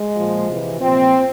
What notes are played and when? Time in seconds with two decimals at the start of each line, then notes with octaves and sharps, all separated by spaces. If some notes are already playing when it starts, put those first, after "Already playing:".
Already playing: G#3
0.15 A#2 F3
0.47 C3 E3
0.80 A#2 F3 C4